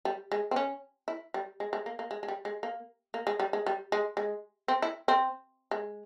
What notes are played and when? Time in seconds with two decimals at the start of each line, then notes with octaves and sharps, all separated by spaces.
0.05 G3
0.32 G#3
0.51 C4
0.56 C#4
1.08 E4
1.34 G3
1.60 G#3
1.73 G#3
1.86 A#3
1.99 A#3
2.11 G#3
2.23 G#3
2.28 G3
2.45 G#3
2.63 A#3
3.14 A#3
3.27 G#3
3.40 G3
3.53 G#3
3.66 G3
3.92 G#3
4.17 G#3
4.68 C4
4.82 E4
5.08 C4
5.71 G#3